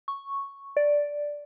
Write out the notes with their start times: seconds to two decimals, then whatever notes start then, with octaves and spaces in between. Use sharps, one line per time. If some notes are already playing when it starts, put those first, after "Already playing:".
0.08 C#6
0.77 D5